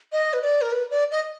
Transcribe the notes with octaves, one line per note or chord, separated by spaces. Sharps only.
D#5
B4
D5
A#4
B4
D5
D#5